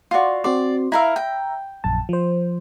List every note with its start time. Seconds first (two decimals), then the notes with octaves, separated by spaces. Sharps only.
0.11 F4 F#4 D5 C6
0.44 C4 F#4 D5 C6
0.92 E4 A#4 E5 F5 A#5
1.16 G5
1.84 A#1 F#2 A5
2.09 F3 C5